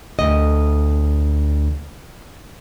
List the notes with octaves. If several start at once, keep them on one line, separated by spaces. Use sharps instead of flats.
D2 D#5